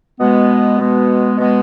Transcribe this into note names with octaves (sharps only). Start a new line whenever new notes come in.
B2 G#3 B3
B2 G#3 B3
B2 G#3 B3